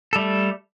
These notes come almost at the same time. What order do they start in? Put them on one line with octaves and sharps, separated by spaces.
A4 G3 A3